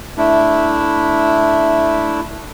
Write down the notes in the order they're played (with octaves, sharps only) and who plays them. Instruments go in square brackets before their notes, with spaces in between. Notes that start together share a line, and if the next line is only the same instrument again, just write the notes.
[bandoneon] A3 D4 E4